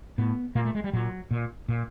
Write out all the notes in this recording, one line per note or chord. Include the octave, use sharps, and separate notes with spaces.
A2 B3
A#2 A#3
A3
G#3
G3
A#2 F#3
A#2
A#2